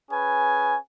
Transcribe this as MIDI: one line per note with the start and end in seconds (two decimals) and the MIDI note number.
0.11 0.75 61
0.11 0.75 68
0.11 0.75 71
0.11 0.75 80